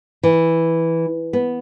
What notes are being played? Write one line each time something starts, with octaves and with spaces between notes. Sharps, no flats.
E3
B3